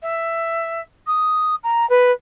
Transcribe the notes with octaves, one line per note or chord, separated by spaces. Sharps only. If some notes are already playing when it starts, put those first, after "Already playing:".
E5
D#6
A#5
B4